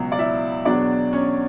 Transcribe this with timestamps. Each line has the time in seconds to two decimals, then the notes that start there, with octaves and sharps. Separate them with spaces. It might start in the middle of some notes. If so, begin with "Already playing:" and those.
Already playing: C#2 B2 F#3
0.12 D5
0.19 E4 E5
0.65 E2 B2 F#3 D4 D5
1.13 C#4 C#5